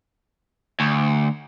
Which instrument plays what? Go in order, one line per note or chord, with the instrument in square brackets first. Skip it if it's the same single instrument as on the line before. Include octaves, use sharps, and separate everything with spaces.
[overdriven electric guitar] D2